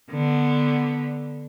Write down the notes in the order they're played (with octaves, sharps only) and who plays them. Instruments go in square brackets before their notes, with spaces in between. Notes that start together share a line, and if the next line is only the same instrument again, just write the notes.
[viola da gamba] D3 B3